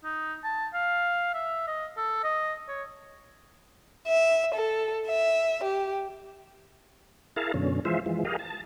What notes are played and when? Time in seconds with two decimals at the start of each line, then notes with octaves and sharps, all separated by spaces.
0.04 D#4
0.44 A5
0.73 F5
1.34 E5
1.67 D#5
1.97 A4
2.24 D#5
2.68 C#5
4.07 E5
4.54 A4
5.07 E5
5.64 G4
7.36 E4 G#4 A#4 F5 A5
7.54 F#2 B2 D3 C#4
7.85 E3 F3 G#3 F4 C5 E5
8.06 E3 F3 G#3
8.25 G4 G#4 A#4 D#5 F5
8.39 A5